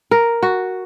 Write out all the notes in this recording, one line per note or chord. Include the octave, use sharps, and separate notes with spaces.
A#4
F#4